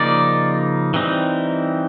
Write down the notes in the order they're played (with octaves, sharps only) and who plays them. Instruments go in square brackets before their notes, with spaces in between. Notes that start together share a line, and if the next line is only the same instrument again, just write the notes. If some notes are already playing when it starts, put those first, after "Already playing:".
Already playing: [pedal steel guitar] C#3 F3 A#3 D#4 D5
E3 G3 C4 D#4